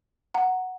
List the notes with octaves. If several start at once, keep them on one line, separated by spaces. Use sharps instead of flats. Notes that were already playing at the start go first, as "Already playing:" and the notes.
F#5 A#5